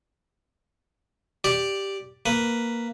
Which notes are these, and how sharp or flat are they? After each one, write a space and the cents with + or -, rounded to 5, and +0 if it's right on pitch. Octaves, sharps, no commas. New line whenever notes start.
G4 +0 D5 +0
A#3 +0 B4 +0